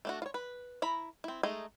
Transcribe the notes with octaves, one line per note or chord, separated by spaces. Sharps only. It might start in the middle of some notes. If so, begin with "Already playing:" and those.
A3 D4 F#4
F4 C#5
B4
E4 A#5 B5
C4 E4
G#3 A3 D#4 G#4